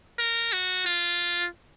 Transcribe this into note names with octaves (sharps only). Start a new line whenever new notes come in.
A#4
F#4
F4